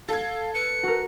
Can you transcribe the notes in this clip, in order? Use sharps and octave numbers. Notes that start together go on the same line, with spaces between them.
A4 F5 G#6
B4 C#7
F#4 A#4